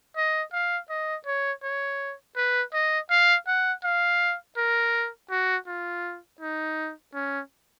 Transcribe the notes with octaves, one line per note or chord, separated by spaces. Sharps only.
D#5
F5
D#5
C#5
C#5
B4
D#5
F5
F#5
F5
A#4
F#4
F4
D#4
C#4